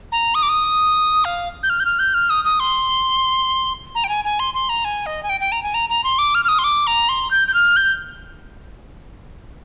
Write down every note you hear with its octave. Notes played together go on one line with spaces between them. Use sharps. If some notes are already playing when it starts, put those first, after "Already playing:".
A#5
D#6
D6
D#6
F5
G6
F6
G6
F6
G6
F6
D#6
D#6
C6
A#5
G5
G#5
G#5
C6
C6
A#5
G#5
D#5
G#5
G5
G5
A#5
G#5
A#5
A#5
C6
D6
F6
F6
D#6
C6
D6
A#5
C6
G6
G6
F6
G6